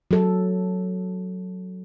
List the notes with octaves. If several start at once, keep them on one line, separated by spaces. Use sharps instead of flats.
F#3 A4